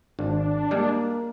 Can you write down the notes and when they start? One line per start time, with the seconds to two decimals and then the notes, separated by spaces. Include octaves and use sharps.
0.19 G#1 D4
0.71 G3 G#3 A#3